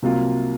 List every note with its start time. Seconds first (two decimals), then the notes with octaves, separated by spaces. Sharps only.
0.02 C2 C3 F#3 A#3 F4